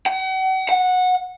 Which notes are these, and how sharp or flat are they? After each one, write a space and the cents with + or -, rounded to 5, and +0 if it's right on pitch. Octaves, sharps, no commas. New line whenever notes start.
F#5 +40
F#5 -15